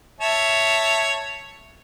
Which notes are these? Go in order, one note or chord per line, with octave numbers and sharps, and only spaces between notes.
C#5 E5 A5